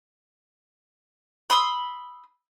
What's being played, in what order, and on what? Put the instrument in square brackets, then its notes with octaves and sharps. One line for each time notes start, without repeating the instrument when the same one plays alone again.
[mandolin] B5 C6 D#6 E6